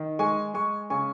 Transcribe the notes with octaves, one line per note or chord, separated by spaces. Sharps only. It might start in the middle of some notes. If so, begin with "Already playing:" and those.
Already playing: D#3
G#3 G#5 C#6
G#3 G#5 C#6
C#3 G#5 C#6